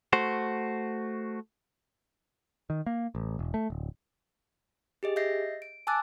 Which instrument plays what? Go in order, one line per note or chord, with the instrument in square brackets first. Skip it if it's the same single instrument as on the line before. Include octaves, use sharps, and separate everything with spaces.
[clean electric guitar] A3 F#4 C5
[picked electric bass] D#3
A#3
A1
E1
A3
D1
[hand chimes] G4 G#4 D#5
D#5 E5 G6 A#6 C7
D7
G#5 A5 D6 E6 F#6 A6